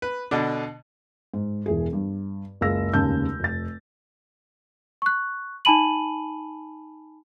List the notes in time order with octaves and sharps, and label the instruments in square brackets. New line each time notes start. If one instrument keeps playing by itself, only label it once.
[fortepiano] B4
B2 D3 D4
[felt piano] G#2
E1 E3 G#4
G2
F#1 C#2 G#4 F5 E6 A#6
F1 D#2 C#3 G#3 A5 G6
F1 A6
[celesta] C#6 F#6
D#4 G#5 A5 B5 D#7 F#7